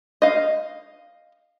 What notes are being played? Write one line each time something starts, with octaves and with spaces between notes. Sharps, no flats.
D#5 F5